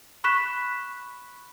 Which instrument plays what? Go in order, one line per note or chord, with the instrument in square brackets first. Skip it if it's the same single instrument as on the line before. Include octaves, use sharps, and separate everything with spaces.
[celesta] B5 C#6 F#6 B6 E7